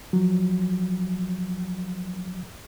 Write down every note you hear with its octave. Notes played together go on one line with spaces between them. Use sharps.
F3 F#3